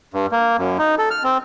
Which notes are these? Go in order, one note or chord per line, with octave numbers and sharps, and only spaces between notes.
G2
A#3
F#2
D#4
A4
F6
C4